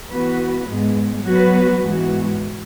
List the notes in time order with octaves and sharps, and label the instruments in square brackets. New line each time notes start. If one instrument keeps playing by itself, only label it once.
[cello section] E3 B3 F#4 B4
G#2 G#3 B3
F#3 B3 F#4 B4
G#2 E3 G#3 B3 F#4